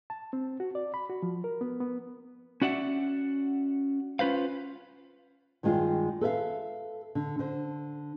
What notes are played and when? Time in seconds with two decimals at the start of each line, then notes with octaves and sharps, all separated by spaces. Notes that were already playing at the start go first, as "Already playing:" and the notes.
0.10 A5
0.33 C4
0.60 F#4
0.75 D5
0.94 B5
1.09 F#4
1.23 F3
1.44 A#4
1.61 B3
1.81 B3
2.62 C#4 F#4 D5 E5 F#5
4.19 C#4 F4 B4 C5 F5
5.63 G2 D#3 G3 G#3 F4
6.21 A4 B4 E5 F5
7.15 D3
7.39 D3 C5